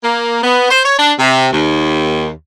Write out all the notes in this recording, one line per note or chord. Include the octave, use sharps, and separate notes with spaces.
A#3
B3
C5
C#5
D4
C3
D#2